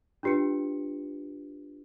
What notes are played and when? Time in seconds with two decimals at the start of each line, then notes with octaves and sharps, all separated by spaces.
0.23 D4 F4 G4 B4 C#7